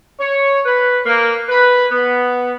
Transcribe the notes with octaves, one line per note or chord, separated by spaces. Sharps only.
C#5
B4
A#3
B4
B3